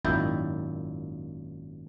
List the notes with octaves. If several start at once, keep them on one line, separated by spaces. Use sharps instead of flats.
G#1 F#2 A#2 D#4 E4 G5